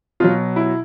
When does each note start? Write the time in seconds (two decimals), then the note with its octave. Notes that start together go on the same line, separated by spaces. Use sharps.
0.20 B2 F#3 F4
0.56 E4